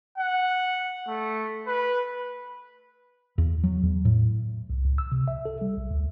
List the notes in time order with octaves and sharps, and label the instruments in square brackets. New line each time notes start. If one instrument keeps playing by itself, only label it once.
[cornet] F#5
A3
B4
[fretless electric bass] E2
F#3
E2
A2
[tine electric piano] C2
C#2
E6
C3
E5
A4
G3
B1
D2